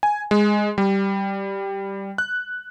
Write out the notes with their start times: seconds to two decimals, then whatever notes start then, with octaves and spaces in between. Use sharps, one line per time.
0.03 G#5
0.31 G#3
0.78 G3
2.18 F#6